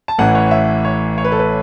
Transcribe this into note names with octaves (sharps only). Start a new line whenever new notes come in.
A5
A1 A2 E3 F#5
C#5
E5
C#5
C#5
B4
A4
B4